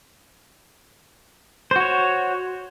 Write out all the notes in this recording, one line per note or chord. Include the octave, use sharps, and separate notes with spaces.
F#4 C5 C#5